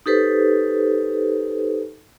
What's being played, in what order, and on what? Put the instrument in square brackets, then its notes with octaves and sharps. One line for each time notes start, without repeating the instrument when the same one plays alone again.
[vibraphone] D#4 G4 A4 B4 C5